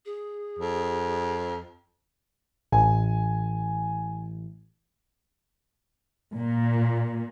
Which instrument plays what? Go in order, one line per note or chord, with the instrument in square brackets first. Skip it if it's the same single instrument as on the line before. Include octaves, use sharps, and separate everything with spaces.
[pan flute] G#4
[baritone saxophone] F2
[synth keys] A1 [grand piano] G#5
[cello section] A#2